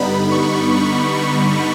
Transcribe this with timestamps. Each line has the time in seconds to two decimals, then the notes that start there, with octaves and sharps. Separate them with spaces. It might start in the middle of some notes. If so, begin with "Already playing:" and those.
Already playing: G2 D3 G3 B3 D#4 B5
0.31 C#6
0.74 C#6
1.17 C#6